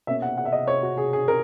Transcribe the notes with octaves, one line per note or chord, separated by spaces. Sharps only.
B2 A#3 C#4 E5
F#5
F#5
E5
D#5
C#5
F#4
G#4
G#4
A#4